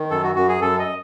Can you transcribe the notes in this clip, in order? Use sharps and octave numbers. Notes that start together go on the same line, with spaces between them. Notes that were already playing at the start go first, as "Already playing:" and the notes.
Already playing: D#3
F#2 A4
F#4
F#2 F#4
G#4
F#2 A4
D#5